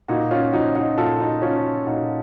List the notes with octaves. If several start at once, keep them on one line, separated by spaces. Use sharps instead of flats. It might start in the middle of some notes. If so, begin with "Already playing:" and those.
A#2 D#4 F#4
C#4 F4
F3 D#4 F#4
D#4 F#4
A#2 F4 A4
D#4 F#4
F3 C#4 F4
A#2 D#4 F#4